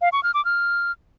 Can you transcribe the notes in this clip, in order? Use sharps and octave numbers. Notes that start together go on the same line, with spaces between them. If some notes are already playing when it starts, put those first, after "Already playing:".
F5
C#6
F6
D6
F6